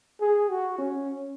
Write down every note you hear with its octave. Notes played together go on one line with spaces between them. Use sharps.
G#4
F#4
C#4